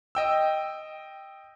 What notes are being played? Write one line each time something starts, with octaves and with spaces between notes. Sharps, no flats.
D#5 G5 E6